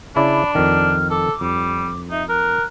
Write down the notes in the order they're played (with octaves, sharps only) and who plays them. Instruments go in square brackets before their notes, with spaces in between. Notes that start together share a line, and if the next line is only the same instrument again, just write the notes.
[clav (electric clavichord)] C#3 E4 D5 [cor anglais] D4 [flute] B5
[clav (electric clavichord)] F2 D#3 [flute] F6
[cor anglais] A4 [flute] D6
[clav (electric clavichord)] F2 [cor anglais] G3
[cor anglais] D#4 [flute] E5
[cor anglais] A#4 [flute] F#6